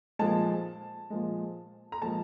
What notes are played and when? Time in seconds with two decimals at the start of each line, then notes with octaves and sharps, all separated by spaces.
0.19 A#2 F3 G#3 A5
1.10 A#2 F3 G#3
1.92 A#5
2.02 A#2 F3 G#3 A5